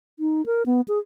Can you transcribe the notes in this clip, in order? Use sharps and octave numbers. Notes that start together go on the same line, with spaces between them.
D#4
A#4
B3
G#4